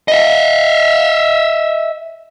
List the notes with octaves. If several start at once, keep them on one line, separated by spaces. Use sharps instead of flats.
D#5 E5